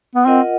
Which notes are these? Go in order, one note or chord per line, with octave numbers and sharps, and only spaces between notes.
B3
C4 F4 A#4 D#5 F#5